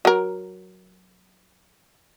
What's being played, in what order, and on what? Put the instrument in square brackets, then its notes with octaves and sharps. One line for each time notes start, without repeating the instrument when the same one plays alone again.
[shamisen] F#3 A#4